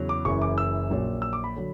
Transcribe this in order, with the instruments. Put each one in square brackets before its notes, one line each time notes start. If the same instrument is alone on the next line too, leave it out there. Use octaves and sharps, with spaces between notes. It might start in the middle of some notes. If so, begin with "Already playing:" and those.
Already playing: [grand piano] E2 C#3 F#3
D6
F#1 F#2 E3 C#6
D6
E6
A#1 A#2 F#3
E6
D6
B5
D3 F#3